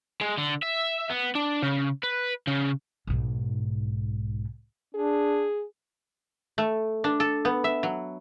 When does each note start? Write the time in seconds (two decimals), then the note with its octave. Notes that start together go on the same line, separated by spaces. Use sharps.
0.21 G#3
0.37 D3
0.63 E5
1.10 B3
1.35 D4
1.63 C#3
2.04 B4
2.47 C#3
3.07 B1 G#2
4.95 D4 G#4
6.58 A3
7.04 D4
7.20 A4
7.45 B3
7.64 E5
7.83 F#3